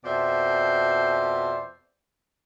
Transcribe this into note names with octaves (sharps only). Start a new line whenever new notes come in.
F2 B2 C5 D5 E5